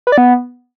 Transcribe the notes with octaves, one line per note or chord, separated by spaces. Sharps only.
B4
D5
B3